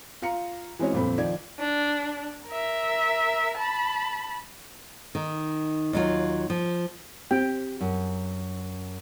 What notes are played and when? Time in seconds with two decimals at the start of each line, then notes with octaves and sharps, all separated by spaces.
0.22 F4 F5 A#5 C#7
0.79 E3 G#3 C4 C#4 F#4 C#5
0.93 G1 F2 A#2 C4 B5
1.18 D#3 F3 D5 G#6
1.60 D4
2.47 A#4 E5
3.58 A5 B5
5.15 D#3
5.93 D#2 F#3 F4
6.50 F3
7.31 C4 G4 G5
7.81 F#2